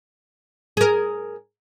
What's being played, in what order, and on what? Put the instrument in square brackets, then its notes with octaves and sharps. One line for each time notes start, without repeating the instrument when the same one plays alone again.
[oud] G#4 A#4